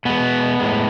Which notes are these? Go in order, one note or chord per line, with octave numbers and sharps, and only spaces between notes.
B2 G#3 B3
A2 G#3